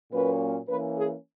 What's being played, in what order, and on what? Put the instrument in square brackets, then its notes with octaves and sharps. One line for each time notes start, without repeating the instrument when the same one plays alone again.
[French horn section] A#2 F#3 A#3 C#4 B4
E3 A#3 C#4 B4
G#4